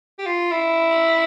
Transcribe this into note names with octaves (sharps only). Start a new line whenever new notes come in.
G4
F4
E4